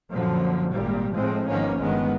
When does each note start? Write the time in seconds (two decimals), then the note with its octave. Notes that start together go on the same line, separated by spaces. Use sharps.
0.10 F#2 A#2 D3 F3
0.73 G#1 A#2 G3 A#3
1.14 A2 F3 G#3 C4
1.48 G#1 D#3 F3 A#3 B3 C#4
1.79 G1 D#3 G#3 B3